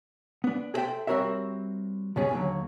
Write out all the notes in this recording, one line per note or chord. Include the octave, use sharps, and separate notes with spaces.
B3 D4
G#4 A4 C5 D#5 E5 G5
G3 C4 F#4 A#4 C#5 E5
C#2 B2 C#4 G#4
D#2 D3 F#3